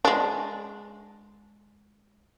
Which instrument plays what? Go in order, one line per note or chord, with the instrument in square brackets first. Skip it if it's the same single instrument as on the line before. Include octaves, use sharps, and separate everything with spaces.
[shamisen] G#3 D4